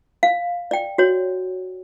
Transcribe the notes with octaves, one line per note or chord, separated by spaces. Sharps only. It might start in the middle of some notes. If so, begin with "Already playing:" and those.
F5
D5 G5
F#4 C#5